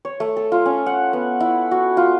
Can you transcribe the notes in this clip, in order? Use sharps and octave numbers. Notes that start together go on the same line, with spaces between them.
C#5
A3
A4
F4
C#4
F#5
B3
E4
F#4
F4